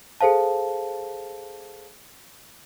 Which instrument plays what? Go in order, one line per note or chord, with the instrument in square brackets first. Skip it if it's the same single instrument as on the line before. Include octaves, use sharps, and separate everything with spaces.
[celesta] G#4 A4 C5 F5 A5